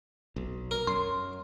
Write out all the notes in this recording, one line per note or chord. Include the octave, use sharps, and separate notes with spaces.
B1
A#4
F#2 C6